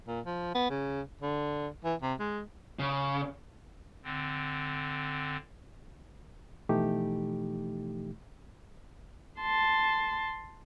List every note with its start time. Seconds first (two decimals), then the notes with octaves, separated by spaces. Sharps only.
0.08 A#2
0.26 F3
0.55 B3
0.70 C#3
1.22 D3
1.84 E3
2.02 C3
2.20 G#3
2.79 C#3
4.04 D3 C4
6.69 B2 E3 F3 A3 D#4 G4
9.40 A5 C6